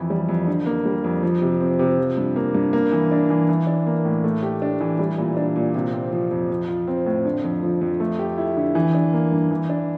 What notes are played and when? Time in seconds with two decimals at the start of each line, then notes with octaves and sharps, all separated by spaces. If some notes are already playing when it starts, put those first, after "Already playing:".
Already playing: F2 E3
0.10 G3
0.29 F2
0.47 D3
0.66 A#3
0.85 G3
1.04 F2
1.23 F3
1.42 C3
1.61 C4
1.79 C3
1.98 F3
2.17 G2
2.36 A#3
2.55 G2
2.73 A#3
2.92 E3
3.11 D4
3.30 E3
3.49 E3
3.67 D4
3.87 A#3
4.05 A2
4.24 A3
4.43 G4
4.62 D4
4.81 E3
4.99 G3
5.18 A#2
5.37 D4
5.56 A#2
5.75 C3
5.93 C4
6.13 F3
6.31 F2
6.50 F3
6.68 F4
6.88 C4
7.06 A2
7.25 D3
7.44 F2
7.63 F3
7.81 F2
8.00 A3
8.19 G4
8.38 E4
8.57 D3
8.75 E3
8.94 D4
9.13 A#3
9.32 G2
9.51 E3
9.69 D4